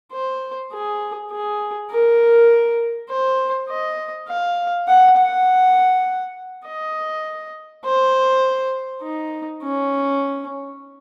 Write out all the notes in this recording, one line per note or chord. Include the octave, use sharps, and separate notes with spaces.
C5
G#4
G#4
A#4
C5
D#5
F5
F#5
F#5
D#5
C5
D#4
C#4